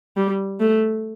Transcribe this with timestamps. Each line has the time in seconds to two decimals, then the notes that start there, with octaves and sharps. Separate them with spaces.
0.17 G3
0.60 A3